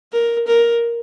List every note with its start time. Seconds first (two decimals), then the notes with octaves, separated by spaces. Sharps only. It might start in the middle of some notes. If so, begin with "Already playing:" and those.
0.12 A#4
0.47 A#4